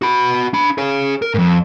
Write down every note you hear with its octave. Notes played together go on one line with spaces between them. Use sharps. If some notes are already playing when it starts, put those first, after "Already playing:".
F#4 B5
D4 B5
G#4 C#5
A#4
F2 G#2